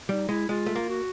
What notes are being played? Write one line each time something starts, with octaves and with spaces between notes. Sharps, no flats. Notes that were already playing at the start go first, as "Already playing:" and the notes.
G3 D#4
G#3 E4
G#3 F4
A3
A#3
F#4